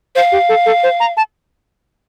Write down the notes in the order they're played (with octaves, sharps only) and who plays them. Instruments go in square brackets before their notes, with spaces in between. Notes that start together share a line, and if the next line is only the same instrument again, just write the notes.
[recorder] C5 [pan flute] F5
[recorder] G4
A4
A4
C5
A#5
A5